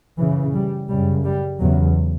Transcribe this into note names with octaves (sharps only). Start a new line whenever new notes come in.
F#2 C#3 E3
G3
F#2 C#3 G3
G3
E2 C#3 F#3